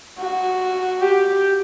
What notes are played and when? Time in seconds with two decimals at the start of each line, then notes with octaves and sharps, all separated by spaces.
0.19 F#4
1.01 G4